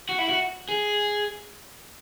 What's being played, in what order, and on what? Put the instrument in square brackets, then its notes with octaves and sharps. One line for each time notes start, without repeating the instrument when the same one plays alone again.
[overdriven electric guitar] F#4
E4
F#4
G#4